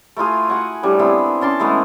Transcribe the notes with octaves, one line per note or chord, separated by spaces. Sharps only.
A3 E4 F4 G#4
F#4 F#5 G#5
A2 G3 D4
B3 C4 E4 G#4
C#4 A5 C6 D6
E3 G#3 A3 B3